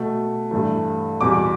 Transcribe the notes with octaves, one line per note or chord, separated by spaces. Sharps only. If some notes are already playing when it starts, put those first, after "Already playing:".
Already playing: B2 A3
G2 E3 A3
E2 B2 G3 D6